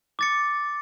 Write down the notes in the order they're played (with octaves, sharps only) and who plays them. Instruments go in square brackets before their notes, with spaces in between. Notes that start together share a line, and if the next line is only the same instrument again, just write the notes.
[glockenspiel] D6 A6 C#7